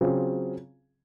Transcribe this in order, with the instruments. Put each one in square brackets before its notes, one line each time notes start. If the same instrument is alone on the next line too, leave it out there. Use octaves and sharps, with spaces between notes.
[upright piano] C#3 F#3 C4 F4 G#4